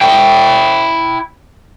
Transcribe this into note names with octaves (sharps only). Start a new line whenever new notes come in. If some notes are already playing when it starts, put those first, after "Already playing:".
E4 G5